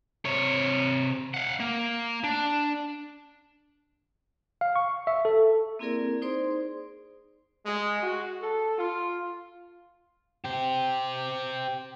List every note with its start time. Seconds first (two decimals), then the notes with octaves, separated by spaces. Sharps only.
0.25 C3 C#5
1.34 F5 F#5
1.60 A#3
2.24 D4
4.61 F5
4.76 C#6
5.07 E5
5.25 A4
5.79 A#3 C4 E4 G#4 A#4 D5
6.22 D#4 G#4 C5 D5 C6
7.66 G#3
8.03 F#4
8.41 A4
8.78 F4
10.45 G4 C5